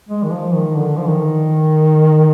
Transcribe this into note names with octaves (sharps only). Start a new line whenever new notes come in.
G#3
D#3
F3
D#3
D3
F3
D#3